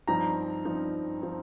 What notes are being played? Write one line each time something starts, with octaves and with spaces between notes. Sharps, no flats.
G2 F3 C4 D#4 A#5
G2 F3 C4 D#4
F3 C4 D#4